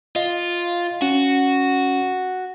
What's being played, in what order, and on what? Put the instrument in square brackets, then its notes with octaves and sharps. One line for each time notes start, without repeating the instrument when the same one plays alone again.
[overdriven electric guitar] F4 [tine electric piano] D#5
[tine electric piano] C#4 [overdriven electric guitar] F#4